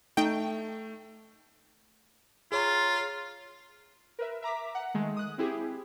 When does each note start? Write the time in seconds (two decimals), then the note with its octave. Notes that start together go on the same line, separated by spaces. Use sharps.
0.17 A3 D#4 G5
2.52 F4 G#4 C#5 A#5
4.19 A#4 B4 E5
4.42 E5 A#5 D6 B6
4.75 F#5
4.94 D#3 G#3 A3
5.17 D#6 F#6
5.38 C4 E4 G4 G#4